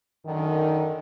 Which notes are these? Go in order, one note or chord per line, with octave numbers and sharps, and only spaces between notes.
F#2 D3 D#3